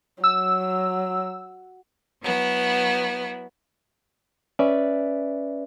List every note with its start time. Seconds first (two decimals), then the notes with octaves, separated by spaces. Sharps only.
0.24 F#3 E6
2.22 F#3 B3 E4
4.59 C#4 B4 D5 E5